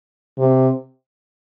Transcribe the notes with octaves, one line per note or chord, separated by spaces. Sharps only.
C3